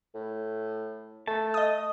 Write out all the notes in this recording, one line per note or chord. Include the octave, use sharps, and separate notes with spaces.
A2
A3 A5
D#5 D#6